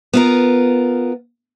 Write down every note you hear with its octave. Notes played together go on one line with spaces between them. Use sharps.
B3 F4 A#4